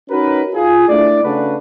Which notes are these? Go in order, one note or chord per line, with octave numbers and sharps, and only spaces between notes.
C#4 D#4 F#4 A#4 B4
F4 G#4
A3 D4 E4 D5
C#3 A3 C#4 D4 F#4 B4